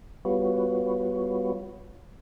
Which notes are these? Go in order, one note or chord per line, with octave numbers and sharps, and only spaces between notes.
G3 B3 F4 F#4 B4 C#5